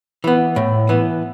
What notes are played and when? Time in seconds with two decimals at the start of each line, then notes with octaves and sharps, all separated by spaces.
0.24 E3 B3
0.56 A2
0.89 E3 B3